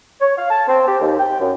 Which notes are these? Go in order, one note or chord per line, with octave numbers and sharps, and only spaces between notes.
C#5
F5
A5
C4
G4
D#2
G5
F#2